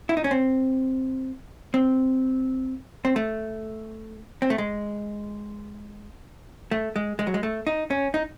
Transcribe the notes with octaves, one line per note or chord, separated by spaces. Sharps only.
E4
D#4
C#4
C4
C4
C4
A3
C4
A3
G#3
A3
G#3
G#3
F#3
G#3
A3
D#4
C#4
D#4